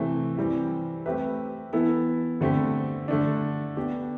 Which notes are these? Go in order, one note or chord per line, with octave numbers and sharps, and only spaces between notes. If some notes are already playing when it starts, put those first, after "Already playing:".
Already playing: C3 E3 A3 C4
E3 G3 C4
A3 C4 G4 B4 E5
E3 B3 E4 A4
D3 A3 C4 G4
D3 A3 D4
B3 D4 G4